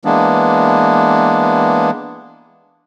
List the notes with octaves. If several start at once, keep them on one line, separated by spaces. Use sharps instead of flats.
E3 G#3 A#3 B3 D4